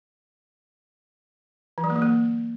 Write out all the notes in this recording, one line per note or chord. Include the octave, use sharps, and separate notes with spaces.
E3
F#3
A#3
F#3
A#3